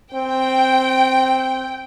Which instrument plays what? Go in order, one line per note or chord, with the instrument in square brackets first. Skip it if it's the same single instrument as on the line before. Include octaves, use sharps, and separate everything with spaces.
[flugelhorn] C4 [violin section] G5